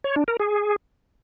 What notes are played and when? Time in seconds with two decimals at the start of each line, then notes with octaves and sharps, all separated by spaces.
0.04 C#5
0.16 D4
0.28 A#4
0.40 G#4